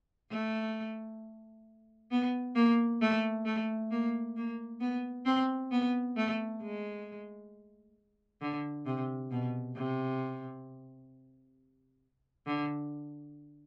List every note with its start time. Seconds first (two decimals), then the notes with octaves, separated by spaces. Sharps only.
0.30 A3
2.11 B3
2.55 A#3
3.01 A3
3.45 A3
3.91 A#3
4.36 A#3
4.80 B3
5.25 C4
5.71 B3
6.17 A3
6.61 G#3
8.41 D3
8.86 C3
9.31 B2
9.76 C3
12.46 D3